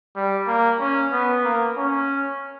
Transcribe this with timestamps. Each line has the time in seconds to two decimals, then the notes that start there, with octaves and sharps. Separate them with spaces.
0.16 G3
0.47 A#3
0.80 C#4
1.12 B3
1.45 A#3
1.78 C#4